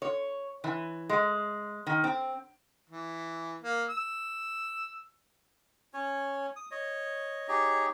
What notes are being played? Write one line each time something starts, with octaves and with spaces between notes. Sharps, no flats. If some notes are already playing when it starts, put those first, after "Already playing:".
C#5
E3
G#3
D#3
C4
E3
A#3
E6
C#4 C#5
D#6
C#5 D#5
D#4 G4 G#4 C#5